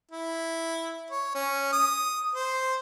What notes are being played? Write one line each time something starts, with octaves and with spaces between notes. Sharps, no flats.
E4
C#5
C#4
D#6
C5